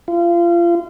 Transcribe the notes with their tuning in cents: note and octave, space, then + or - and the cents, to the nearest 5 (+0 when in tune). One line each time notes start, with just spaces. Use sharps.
F4 -30